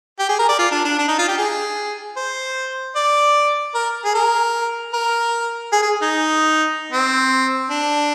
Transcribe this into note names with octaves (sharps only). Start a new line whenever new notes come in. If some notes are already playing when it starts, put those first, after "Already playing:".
G4
G#4
A#4
D5
F4
D4
D4
D4
D#4
F4
G4
G#4
C5
D5
A#4
G#4
A#4
A#4
G#4
G#4
D#4
C4
D4